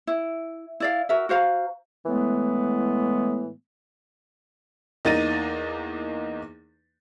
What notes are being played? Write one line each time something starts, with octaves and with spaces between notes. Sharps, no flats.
E4
E4 D5 F5
F#4 A#4 E5
F#4 C5 F5 A#5
A2 E3 G#3 A3 B3
E2 A#3 D#4 A6 A#6 D#7